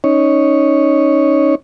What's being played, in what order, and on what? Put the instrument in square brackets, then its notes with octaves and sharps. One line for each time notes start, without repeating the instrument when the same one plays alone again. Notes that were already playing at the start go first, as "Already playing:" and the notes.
[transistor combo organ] C#4 D#4 C#5